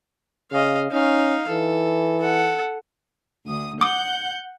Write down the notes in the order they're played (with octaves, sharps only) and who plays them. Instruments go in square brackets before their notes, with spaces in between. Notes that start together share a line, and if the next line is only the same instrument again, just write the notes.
[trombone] C#3 [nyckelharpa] D#5 F5
[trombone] C#4 [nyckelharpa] D#4 F5
[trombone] E3 [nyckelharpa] A4
[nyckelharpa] A4 F#5
[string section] D2 D#6
[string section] F#5 G6 [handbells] D6 D#6